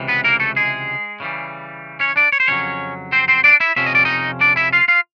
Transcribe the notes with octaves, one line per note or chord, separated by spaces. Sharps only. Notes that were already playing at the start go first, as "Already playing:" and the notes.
Already playing: C#2 C3 E3
B3 B4
A#3 A#4
A3 A4
G#3 G#4
C#3 E3 G3
C#4 C#5
D4 D5
C#5
C5
F2 C#3 F#3 C#4 C#5
C4 C5
C4 C5
D4 D5
E4 E5
F2 C3 F3 C#4 E5
D#5
D5
D#4 D#5
D4 D5
E4 E5
F4 F5
F4 F5